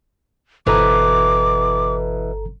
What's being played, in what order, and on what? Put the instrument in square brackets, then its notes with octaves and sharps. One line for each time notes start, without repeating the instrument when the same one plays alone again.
[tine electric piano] G1 A4 A#5 [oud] B2 E3 [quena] D6